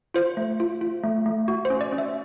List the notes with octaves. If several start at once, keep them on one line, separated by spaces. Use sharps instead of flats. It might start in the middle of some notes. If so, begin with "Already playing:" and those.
F4 C5
A3
F4
F4
A3
A3
F#4
C5
C#4
D5
C#4
E5